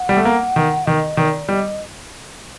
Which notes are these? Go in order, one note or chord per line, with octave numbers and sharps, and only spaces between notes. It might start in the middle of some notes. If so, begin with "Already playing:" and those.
Already playing: F#5
G3
A3
A#3
D#3
D#3 D#5
D#3 D5
G3 D#5